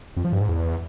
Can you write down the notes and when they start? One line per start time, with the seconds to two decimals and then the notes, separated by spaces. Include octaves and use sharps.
0.16 F2
0.25 F3
0.33 G2
0.41 G#2
0.49 E2